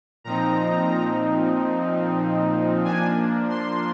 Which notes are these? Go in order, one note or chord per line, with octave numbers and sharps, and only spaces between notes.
A#2 F3 C4 D#4 A#5
F3 A#3 D4 G#5
C6